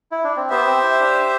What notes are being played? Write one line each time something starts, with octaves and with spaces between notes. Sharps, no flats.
E4
D4
C4
B3 G4 C5 E5
C4
E4
D4